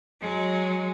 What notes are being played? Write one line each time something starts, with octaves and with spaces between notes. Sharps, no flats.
F#3 G#3